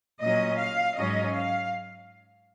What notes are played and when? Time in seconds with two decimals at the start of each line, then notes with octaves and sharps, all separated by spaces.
0.21 A#2 F#3 C#4 D#5
0.59 F5
0.96 G#2 F#3 C#4 D#5
1.34 F5